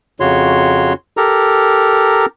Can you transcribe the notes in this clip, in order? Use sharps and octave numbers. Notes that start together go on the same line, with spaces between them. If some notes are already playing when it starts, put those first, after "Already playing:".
F2 C#3 F#4 C#5 C6
G4 A4 A#4 A#5